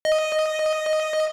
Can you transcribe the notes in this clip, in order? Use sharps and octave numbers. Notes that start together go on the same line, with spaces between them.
D#5